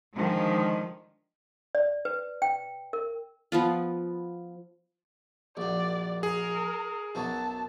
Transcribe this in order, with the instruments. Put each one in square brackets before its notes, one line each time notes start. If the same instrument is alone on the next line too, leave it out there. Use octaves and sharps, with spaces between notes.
[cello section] D3 D#3 F3 G#3
[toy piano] D5
B4
G5
A#4
[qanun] F3 B3 F4
[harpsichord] A#1 F#2 [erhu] D5
[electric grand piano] G#4 [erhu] A#4
[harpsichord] B1 F#2 F#3 [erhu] A5